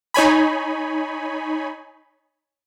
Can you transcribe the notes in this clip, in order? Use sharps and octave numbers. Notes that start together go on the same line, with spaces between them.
D#4 C#5 G#5 B5